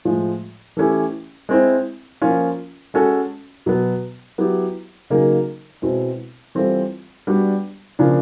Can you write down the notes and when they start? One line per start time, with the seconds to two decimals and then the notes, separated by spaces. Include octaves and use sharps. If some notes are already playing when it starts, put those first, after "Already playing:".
0.05 A2 F3 G#3
0.77 E3 A3 C#4 E4 G4
1.49 G#3 C4 E4
2.22 F3 A#3 C#4 F4
2.94 G#3 C#4 F#4 A4
3.66 B2 F#3 B3
4.38 F#3 B3 E4 G4
5.10 C#3 F#3 A#3 D#4 G#4
5.82 B2 G#3 C4 E4
6.55 E3 G3 C4 F4 A4
7.27 G3 B3 D4 F#4
7.99 C#3 F3 A#3 D4